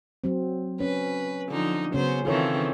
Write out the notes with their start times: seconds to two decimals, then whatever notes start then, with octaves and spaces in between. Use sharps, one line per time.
0.24 F#3 C4
0.80 C#4 B4
1.49 D3 F3 D#4
1.94 C#3 F#3 B3 C#4 C5
2.25 D#3 E3 C4 F4 A4 C#5